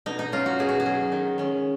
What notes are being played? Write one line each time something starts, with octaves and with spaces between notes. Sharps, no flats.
B2 D#4
D#4
F#3 C#4 F4
F#4
B2 G#4
F#4
G#4
F#3 C#4
D#3
G#3 C#4